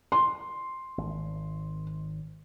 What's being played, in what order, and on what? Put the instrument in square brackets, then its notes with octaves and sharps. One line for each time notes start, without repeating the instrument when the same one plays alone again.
[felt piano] C6
[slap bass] G#1